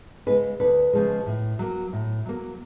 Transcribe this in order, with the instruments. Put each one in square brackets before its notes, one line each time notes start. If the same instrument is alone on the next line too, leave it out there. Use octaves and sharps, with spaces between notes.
[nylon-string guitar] C#3 F3 G#3 B4
D2 B4
C#3 F3 G#3
A2
F#3 A#3
A2
F#3 A#3